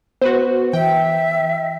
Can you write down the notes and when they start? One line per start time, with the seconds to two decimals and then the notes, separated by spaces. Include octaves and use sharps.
0.21 B3 F#4 B4 C5
0.73 E3 E5 G5